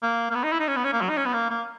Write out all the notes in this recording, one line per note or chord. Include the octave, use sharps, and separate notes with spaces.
A#3
A#3
B3
D#4
E4
D#4
C#4
B3
C#4
A#3
F#3
D#4
C#4
B3
A#3
A#3